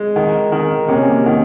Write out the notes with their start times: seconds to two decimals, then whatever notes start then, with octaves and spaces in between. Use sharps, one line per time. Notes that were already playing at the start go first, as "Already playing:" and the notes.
Already playing: G#3
0.16 D#3
0.52 D#3
0.88 C3 A#3 C#4
1.26 D#3